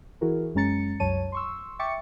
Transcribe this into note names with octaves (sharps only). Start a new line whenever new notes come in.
E3 E4 F#4 G#4 A#4
F#2 G#3 C#4 A#5 A6 C#7
C2 F#2 F#3 C#5 A5 D#7
C6 C#6 E6
E5 G5 C#6 D6 A6 C#7